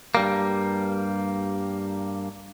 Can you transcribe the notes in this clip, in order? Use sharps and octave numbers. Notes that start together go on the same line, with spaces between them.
G2 G3 A#3